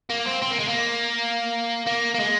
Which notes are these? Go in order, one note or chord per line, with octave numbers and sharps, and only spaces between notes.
A#3
C4
C4
A#3
G#3
A#3
A#3
A#3
G#3